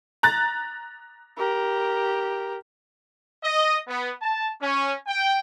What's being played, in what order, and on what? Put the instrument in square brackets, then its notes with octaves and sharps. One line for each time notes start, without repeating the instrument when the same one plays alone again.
[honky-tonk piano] A#5 F#6 A6
[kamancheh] G4 A#4
[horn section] D#5
B3
A5
C#4
G5